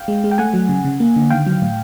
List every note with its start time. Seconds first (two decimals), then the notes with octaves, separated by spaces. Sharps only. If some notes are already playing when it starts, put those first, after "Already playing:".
Already playing: F5 G5
0.08 G#3
0.24 G#3
0.31 G5
0.38 A3 F#5 G#5
0.54 F#3
0.69 C#3
0.84 C#3
1.00 A#3
1.16 D3
1.30 D#3 F5 G5
1.46 F#3
1.62 A2